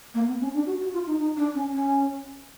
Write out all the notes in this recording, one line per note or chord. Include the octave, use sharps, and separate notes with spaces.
A#3
B3
C#4
D4
F#4
F#4
F4
D#4
D#4
D4
C#4
C#4